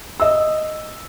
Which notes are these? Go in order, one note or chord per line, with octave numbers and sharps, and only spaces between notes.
D#5 E6